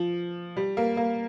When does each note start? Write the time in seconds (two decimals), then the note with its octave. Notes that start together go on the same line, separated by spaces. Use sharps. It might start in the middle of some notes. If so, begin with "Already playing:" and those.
Already playing: F3
0.57 G3
0.77 A#3
0.97 A#3